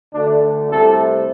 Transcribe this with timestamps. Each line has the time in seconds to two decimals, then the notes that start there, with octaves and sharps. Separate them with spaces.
0.13 D2 D3 A3 D4
0.70 C2 C3 A3 A4